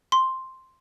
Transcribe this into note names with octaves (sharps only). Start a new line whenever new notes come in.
C6